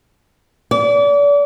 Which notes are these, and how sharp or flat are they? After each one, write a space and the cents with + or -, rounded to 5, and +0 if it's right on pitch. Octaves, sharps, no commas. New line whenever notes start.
D5 -35